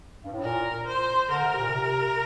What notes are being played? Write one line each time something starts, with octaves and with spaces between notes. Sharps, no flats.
G2
A2
A#2 A#4
C5
D3 A#4
C3
A#2
C3